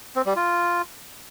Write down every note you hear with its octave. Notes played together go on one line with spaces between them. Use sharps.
C4
G3
F4